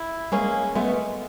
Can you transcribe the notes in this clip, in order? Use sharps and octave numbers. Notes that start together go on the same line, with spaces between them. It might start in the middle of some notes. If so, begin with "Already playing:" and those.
Already playing: E4
G#3 A#3 C#4
G#3 A3 B3